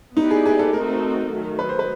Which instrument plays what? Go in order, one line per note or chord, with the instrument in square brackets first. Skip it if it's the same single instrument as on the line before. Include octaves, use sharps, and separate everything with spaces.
[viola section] B3 E4 G4 B4 D5 [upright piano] D#4
[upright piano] G#4
G#4
A4
[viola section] A3 C4 D#4 F#4 A4 [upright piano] A#4
[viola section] D#3 F#3 A3
[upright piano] B4
C5
B4